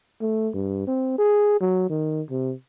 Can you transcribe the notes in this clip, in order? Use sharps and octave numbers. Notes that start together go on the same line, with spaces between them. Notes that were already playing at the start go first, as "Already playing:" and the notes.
A3
G2
C4
G#4
F#3
D#3
C3